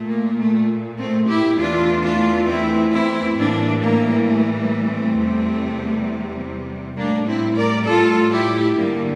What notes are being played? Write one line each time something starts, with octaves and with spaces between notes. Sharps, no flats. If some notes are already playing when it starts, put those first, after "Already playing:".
Already playing: A#2 A3
A#3
A3
A3 C4
E4 G4
E2 E3 A3 D4 F4
D4 F4
C4 E4
C4 E4
A2 E3 G3 A#3 D4
A#3
A3
A#3
A3 C4
E2 C3 G3
A2 G3 A#3 D4
C4 E4
A#4 D5
F4 A4
E4 G4
G2 D3 G3 A#3